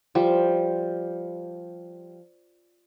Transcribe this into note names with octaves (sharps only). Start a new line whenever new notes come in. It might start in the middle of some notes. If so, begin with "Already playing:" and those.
F3 G3